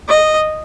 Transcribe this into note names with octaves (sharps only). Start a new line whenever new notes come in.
D#5